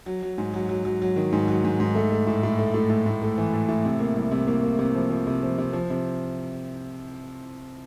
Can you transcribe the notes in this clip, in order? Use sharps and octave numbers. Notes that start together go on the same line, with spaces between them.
F#3
F#3
G#2
F#3
F#3
F#3
F#3
D#3
G#2
F#3
G#2
G#2
A3
A3
A2
A2
A3
A2
A2
A2
A3
E3
A2
A2
C3
A#3
C2
C3
A#3
A#3
C3
F3
F3
C3
F3
C3
F3
C3